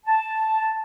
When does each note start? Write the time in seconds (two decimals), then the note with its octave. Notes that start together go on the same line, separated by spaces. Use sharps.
0.06 A5